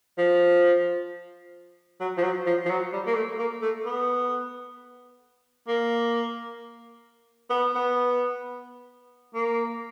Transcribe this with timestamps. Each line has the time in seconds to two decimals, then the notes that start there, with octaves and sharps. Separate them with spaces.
0.18 F3
2.00 F#3
2.17 F3
2.23 F#3
2.46 F3
2.65 F3
2.70 F#3
2.93 G3
3.06 A#3
3.15 A3
3.39 A#3
3.62 A3
3.84 B3
5.68 A#3
7.50 B3
7.75 B3
9.34 A#3